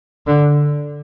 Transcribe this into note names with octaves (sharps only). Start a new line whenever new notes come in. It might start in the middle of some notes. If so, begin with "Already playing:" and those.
D3